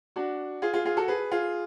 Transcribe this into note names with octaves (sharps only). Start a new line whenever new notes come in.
D4 F#4
F4 G#4
F4 G#4
F4 G#4
F#4 A4
G#4 B4
F4 G#4